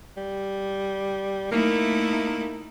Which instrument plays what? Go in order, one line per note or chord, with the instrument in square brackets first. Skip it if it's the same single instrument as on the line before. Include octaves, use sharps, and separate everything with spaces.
[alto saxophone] G3
[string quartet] A3 D#4 E4 [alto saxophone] A#3